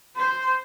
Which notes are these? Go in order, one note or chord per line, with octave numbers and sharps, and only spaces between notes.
C5